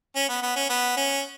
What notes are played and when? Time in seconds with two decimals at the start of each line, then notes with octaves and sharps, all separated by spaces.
0.16 C#4
0.29 B3
0.42 B3
0.56 C#4
0.70 B3
0.97 C#4